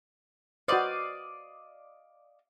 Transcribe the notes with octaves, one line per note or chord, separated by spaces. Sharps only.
F#4 B4 C5 D5 D#5 F5